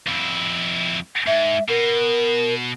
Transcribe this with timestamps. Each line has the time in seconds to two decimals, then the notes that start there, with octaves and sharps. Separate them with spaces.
0.07 F2 E4
1.27 G#2 E5
1.69 B2 A#4